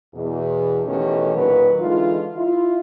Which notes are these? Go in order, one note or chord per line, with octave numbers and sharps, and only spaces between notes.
E2 B2
B2 D#3 E3 A3 C#4 G4
D#2 A#2 D#3 F#3 B4
D3 E3 G#3 D#4 F4
E4 F4